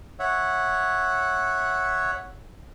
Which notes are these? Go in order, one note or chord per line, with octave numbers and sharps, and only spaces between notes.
C#5 E5 F#5